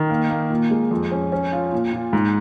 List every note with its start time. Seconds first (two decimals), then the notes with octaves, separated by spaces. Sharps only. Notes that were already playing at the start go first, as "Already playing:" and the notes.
Already playing: D#3
0.10 A#3
0.30 A#3
0.50 A#2
0.71 G#3
0.91 F2
1.12 C#4
1.32 C#4
1.53 F4
1.72 A#2
1.93 A#2
2.13 G#2